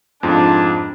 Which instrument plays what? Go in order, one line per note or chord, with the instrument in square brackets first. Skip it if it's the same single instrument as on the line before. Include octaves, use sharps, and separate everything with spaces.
[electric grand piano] F2 G#2 F4 [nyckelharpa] D4 [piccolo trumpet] A5